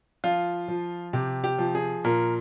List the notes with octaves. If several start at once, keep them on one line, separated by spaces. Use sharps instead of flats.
F3 F4
F3
C3 G4
G4
F3
G#4
A#2 A#4